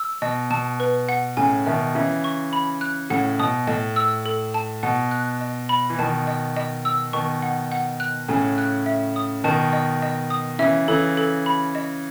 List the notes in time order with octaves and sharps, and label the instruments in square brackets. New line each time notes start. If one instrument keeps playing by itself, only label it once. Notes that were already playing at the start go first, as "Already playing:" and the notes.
Already playing: [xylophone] E6
[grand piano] B2 [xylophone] D#5
[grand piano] B2 [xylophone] A5
[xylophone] B4
F#5
[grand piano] A2 C#3 [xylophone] G#5
[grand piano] B2 D#3 [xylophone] E5
[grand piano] C#3 E3 [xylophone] E5
[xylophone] C#6
B5
F#6
[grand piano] A2 C#3 [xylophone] F#5
[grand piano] B2 [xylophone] D#6
[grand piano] A2 [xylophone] D#5
[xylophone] E6
A4
A5
[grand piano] B2 [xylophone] F#5
[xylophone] F#6
D#5
B5
[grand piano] E3
[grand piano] B2 D#3 [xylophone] A5
[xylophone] D#5
D#5
E6
[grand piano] B2 D#3 [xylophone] C#6
[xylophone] F#5
F#5
F#6
[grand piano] A2 C#3 [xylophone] G#5
[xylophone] F#6
E5
D#6
[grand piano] B2 D#3 [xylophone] A5
[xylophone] D#5
D#5
D#6
[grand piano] C#3 E3 [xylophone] E5
[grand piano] C#3 E3 [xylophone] A4
[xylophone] A4
B5
D#5